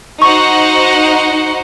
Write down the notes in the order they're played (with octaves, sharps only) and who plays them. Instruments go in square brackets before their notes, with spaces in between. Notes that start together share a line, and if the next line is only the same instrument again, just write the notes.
[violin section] D#4 F#4 C5 F#5 [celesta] C#6